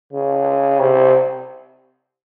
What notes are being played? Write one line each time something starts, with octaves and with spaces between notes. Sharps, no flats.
C#3
C3